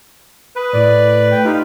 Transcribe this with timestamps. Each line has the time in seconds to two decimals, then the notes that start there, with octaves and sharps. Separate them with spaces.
0.56 B4 D#6
0.73 A2 D5
1.31 G5
1.44 D#4 F4 G4